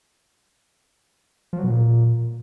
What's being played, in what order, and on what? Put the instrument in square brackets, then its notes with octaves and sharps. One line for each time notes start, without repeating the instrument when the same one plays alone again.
[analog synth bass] F3
F#3
B2
A#2